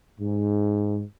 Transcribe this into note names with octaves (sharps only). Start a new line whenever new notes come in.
G#2